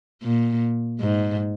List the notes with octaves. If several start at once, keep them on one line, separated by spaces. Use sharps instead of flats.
A#2
G#2